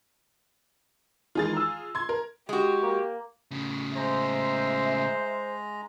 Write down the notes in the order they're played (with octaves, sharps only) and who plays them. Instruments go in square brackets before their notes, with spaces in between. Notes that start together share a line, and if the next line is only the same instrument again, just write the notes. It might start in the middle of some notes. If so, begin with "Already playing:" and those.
[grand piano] D#3 E3 G#3 [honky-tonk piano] F4 G#4 A6
[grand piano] A#5 E6
[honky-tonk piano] C6 G#6
A#4
[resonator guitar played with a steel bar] G#3 F#4 [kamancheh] G4
[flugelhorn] A#3
[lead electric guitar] A2 C#3
[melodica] G#3 A#5 [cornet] C5 [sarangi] E5